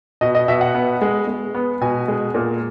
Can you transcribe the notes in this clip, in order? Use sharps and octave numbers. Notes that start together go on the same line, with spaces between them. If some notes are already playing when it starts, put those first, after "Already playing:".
B2 D#5
D#5
B2 E5
F#5
B3
G#3
G#3
B3
B2 G#5
G#3
A#2